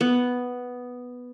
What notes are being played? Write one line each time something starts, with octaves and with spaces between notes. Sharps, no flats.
B3